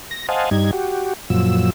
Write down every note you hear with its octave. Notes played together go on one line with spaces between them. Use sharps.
A#6
C5 D#5 F5 F#5 G#5 A5
G2 G3 D#4 G#6
F#4 G4
F#2 A#2 F3 F#3 E6